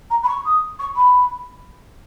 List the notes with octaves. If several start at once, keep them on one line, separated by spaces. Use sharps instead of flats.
A#5
B5
C#6
D#6
C#6
B5